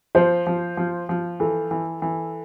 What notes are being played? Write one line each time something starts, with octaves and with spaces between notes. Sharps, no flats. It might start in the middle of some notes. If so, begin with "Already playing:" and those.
F3 C5
F3
F3
F3
E3 A4
E3
E3